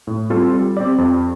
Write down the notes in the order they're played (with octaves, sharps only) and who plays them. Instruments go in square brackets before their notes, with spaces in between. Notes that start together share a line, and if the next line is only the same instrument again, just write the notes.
[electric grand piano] A2
G3 C4 F4 A4
G3
C4 G4 D5
F2